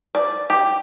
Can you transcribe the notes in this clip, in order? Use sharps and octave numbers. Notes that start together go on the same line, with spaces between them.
D5
G4